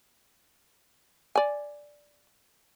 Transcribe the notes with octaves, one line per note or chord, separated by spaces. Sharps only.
D5 G#5